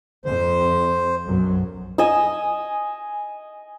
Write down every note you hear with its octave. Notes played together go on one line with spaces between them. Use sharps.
F2 C5
B1 F#2 F#3
D#5 G#5 D#6 E6